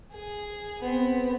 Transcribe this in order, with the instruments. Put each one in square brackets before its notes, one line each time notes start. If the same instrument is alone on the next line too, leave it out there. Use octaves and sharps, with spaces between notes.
[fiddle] G#4
B3 C4